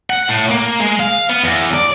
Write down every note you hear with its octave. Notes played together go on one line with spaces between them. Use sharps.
F#5
A2
A#3
G#3
F5
B3
E2
D5